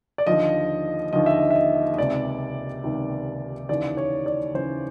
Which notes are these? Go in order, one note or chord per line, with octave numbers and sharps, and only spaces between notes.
D5
D#2 D3 F3 D#5
D#2 D3 F3 D#5
E5
D#5
E5
D#5
D#5
C#2 C3 D#3 D5
C#2 C3 D#3
D#2 C#3 E3 D5
C#5
D5
D#2 C#3 E3 C5